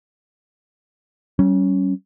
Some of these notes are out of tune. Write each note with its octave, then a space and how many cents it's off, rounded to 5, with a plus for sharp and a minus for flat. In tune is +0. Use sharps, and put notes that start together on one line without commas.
G3 -40 C#4 +0